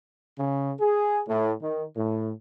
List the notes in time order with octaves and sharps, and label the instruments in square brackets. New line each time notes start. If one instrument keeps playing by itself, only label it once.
[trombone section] C#3
G#4
A2
D#3
A2